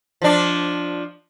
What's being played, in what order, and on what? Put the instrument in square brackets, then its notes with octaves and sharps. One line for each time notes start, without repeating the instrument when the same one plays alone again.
[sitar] F3 D4